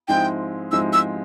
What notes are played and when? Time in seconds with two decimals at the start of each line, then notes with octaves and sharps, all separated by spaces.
0.08 G#2 F3 G#3 C4 E4 G5
0.72 G#2 F3 G#3 C4 E4 E6
0.93 E6